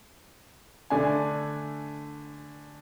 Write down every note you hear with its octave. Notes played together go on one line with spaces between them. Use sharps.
D3 A3 D4 G#5